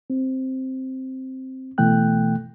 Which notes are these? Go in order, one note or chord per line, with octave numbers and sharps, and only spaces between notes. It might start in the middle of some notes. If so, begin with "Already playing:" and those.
C4
B2 E3 A3 G5 F#6